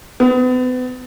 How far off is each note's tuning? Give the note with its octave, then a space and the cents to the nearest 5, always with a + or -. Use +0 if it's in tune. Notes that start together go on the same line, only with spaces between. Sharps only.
B3 +40